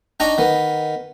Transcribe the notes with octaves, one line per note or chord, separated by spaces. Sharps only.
D4 D#4 G5 A#5 C#6
D#3 B3